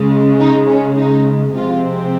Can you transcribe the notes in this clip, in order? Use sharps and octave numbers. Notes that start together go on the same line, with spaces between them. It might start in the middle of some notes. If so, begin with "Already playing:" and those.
Already playing: C#3 G#3
D#4
C#4
D#4
C3 F3 G#3 C4 F4